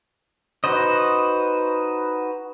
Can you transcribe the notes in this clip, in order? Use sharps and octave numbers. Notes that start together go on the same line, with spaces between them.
D#4 F#4 B4 C5 D#5